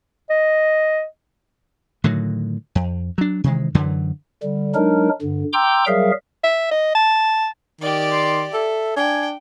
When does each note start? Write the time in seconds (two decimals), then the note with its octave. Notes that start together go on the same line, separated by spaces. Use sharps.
0.30 D#5
2.04 A2 D3 D#3 F#3
2.75 F2
3.18 F#3 D4
3.44 C3 D#3 E3 G#3
3.75 F#2 D3 E3 F#3
4.43 D3 G3
4.75 F#3 G#3 D4 D#4 A#4
5.21 G2 D3
5.53 G5 A#5 C6 D6 E6 G6
5.87 F#3 G3 G#4 A#4 E5 F5
6.44 E5
6.71 D#5
6.95 A5
7.81 D#3 G4 D5
8.12 C6
8.54 A4 E5
8.97 D4 G5 G#5